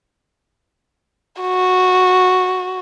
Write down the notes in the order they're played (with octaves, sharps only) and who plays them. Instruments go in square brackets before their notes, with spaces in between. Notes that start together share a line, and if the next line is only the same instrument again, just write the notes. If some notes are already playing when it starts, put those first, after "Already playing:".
[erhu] F#4